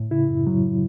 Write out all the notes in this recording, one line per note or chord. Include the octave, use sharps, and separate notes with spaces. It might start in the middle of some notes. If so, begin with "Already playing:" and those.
Already playing: A2
C#3 E4
F#2
F#3